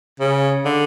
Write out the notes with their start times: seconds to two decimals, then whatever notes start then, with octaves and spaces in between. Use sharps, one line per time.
0.20 C#3
0.65 D3